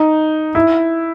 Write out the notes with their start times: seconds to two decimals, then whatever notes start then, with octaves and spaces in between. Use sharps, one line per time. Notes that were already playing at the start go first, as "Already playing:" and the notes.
Already playing: D#4
0.55 E4